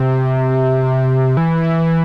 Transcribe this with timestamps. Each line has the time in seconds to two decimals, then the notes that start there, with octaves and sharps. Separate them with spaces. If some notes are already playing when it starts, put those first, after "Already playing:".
Already playing: C3
1.37 E3